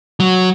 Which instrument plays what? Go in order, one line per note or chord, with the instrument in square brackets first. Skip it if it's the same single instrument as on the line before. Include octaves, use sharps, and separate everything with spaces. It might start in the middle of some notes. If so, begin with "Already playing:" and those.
[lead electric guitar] F#3